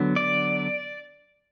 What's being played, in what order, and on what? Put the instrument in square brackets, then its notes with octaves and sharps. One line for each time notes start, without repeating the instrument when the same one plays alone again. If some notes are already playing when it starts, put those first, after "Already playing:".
Already playing: [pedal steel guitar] D3 F#3 B3
D5